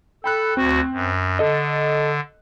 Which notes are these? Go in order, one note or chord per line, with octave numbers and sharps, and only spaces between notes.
A4 G5 B5 F#6
D2 C4 F#4
F#2
D3 A4 D#5